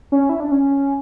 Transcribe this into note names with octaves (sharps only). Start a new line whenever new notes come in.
C#4
E4
D4
C#4